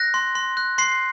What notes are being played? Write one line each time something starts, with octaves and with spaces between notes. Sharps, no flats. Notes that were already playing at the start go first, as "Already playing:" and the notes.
Already playing: F#6 A#6
C6
C6
F#6
C6 C7